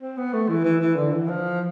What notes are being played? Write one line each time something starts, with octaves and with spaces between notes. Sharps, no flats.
C4
B3
A3
E3
E3
E3
D3
E3
F3